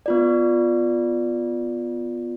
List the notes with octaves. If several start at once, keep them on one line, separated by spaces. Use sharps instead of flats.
B3 F4 D5